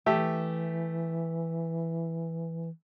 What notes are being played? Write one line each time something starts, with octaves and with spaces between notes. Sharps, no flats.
E3 A3 G4 E5